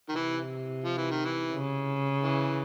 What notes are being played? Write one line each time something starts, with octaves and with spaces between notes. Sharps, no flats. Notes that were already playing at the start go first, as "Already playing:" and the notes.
D#3
C3 E3
F3
E3
D#3
E3
C#3
E3